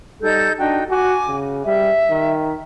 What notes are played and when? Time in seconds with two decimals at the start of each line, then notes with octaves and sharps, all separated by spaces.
0.22 G3 D#4 A4 G6
0.59 D4 D#4 F#4 G5
0.90 F#4 G#5 D6
1.28 C#3
1.66 G3 E5
2.10 D#3